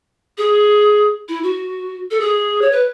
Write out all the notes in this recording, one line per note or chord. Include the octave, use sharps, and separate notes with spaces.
G#4
E4
F#4
A4
G#4
C#5
B4